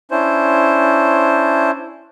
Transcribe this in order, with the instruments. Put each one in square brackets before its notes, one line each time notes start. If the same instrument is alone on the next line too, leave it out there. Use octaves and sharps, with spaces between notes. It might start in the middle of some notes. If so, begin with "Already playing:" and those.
[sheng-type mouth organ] C#4 D4 E4 C5